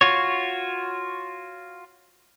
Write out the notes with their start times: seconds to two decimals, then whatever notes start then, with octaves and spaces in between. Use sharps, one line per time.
0.01 F4 F#4 C#5